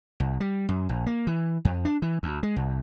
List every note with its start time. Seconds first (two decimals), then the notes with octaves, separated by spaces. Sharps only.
0.20 C2
0.40 G3
0.69 F#2
0.89 A#1
1.06 A#3
1.27 E3
1.65 F2
1.85 D4
2.02 E3
2.23 D2
2.43 G#3
2.56 C2